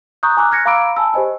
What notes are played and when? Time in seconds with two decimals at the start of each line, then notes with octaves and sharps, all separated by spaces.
0.23 A#5 C#6 D#6 F#6 G6
0.37 G#5 A#5 C#6 D6 E6 F#6
0.51 F6 F#6 G#6 A#6 C#7
0.65 F5 A#5 B5 D6 E6 D7
0.97 G#5 A5 B5 E6
1.14 G4 C5 D#5 G#5